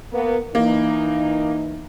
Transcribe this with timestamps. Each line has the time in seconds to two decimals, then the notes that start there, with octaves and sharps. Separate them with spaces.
0.12 A#3 B3
0.55 E3 A#3 D#4